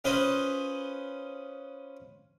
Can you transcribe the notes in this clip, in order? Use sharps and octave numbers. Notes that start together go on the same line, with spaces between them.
C#4 F4 B4 C5 D#5